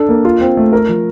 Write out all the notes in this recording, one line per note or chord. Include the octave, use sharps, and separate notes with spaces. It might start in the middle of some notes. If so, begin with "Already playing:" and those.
Already playing: D4 A4
A#3
F4
C4
A3
A#4
F3